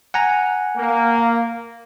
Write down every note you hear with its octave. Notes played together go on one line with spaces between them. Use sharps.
F#5 G#5 A#5
A#3